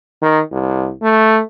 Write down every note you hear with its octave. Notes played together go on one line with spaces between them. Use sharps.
D#3
C2
A3